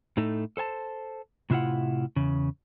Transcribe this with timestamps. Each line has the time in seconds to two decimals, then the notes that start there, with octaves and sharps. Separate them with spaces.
0.17 A2 A3 D#4 A4
0.57 A4 C5 G#5 A5
1.50 A2 C3 D4 E4 F4 F#5
2.16 E2 C#3